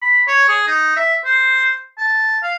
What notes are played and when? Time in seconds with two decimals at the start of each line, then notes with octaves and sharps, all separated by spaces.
0.02 B5
0.28 C#5
0.48 G#4
0.67 D#4
0.96 E5
1.25 C5
1.98 A5
2.43 F5